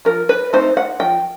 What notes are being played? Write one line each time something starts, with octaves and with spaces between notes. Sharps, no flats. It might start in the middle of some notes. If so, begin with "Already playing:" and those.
F3 A#4
B4
A3 C4 D#4 C5
F#5
F3 G5